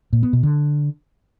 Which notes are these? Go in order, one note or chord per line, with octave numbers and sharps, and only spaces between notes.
A#2
B3
B2
D3